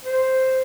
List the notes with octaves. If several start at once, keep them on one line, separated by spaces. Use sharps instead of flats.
C5